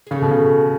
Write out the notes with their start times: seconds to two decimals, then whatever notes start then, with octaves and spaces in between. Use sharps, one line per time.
0.07 G#4
0.11 C#3 A3 A4
0.22 B2
0.31 C#3